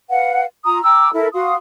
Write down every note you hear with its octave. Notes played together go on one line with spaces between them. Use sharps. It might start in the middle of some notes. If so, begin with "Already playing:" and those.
B4 F5 F#5
F4 A#5 D#6
G5 A#5 D6 E6
E4 A4 A#4
F#4 F5 C6 D#6